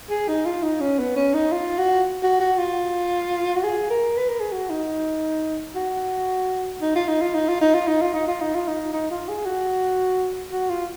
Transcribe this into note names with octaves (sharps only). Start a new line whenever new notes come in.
G#4
D#4
F4
D#4
C#4
B3
C#4
D#4
F4
F#4
F#4
F#4
F4
F#4
G#4
A#4
B4
A#4
G#4
F#4
D#4
F#4
D#4
F4
D#4
F4
D#4
F4
D#4
F4
D#4
F4
D#4
F4
D#4
F4
D#4
D#4
F4
G#4
F#4
F#4
F4